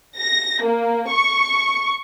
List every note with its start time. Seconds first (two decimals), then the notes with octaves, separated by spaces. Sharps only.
0.17 A#6
0.62 A#3
1.10 C#6